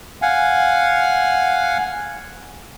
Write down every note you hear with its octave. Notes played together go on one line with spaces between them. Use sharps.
F5 F#5 G#5